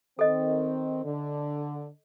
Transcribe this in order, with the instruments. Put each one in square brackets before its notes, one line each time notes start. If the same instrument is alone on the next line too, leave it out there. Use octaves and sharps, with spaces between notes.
[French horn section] D#3 C4 [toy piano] A4 D#5
[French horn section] D3